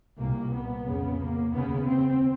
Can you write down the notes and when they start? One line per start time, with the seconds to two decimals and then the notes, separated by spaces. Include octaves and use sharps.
0.18 C2 A#2 A#3
0.52 B3
0.85 F2 C#3
1.19 A#3
1.52 D#2 C#3 B3
1.85 C4